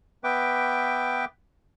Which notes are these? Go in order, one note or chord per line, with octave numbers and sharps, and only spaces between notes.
B3 B4 E5 G5 D6